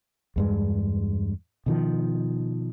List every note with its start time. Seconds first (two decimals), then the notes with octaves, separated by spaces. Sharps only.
0.36 E2 G2 G#3
1.66 B2 D#3 F3